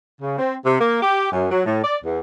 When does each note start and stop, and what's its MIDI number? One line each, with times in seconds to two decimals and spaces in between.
0.21 0.37 49
0.39 0.55 60
0.65 0.79 48
0.79 1.02 58
1.02 1.31 67
1.31 1.46 42
1.51 1.65 54
1.65 1.82 45
1.83 1.98 74
2.04 2.19 40